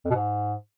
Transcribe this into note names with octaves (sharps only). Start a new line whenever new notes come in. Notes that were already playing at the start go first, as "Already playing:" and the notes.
F2
B2
G#2